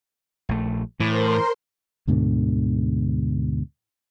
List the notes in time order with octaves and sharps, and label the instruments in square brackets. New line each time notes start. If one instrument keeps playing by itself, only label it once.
[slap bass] A#1 A3
[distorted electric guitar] A2 [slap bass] E3 [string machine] A#4 C5 C6
[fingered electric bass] D2 G#2 B2 D3